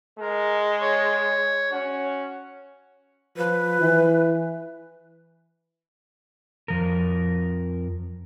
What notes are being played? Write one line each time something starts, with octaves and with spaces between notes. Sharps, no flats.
G#3 A#4
C#5
C#4 F#4
F3 B4
E3
F2 F3 A#4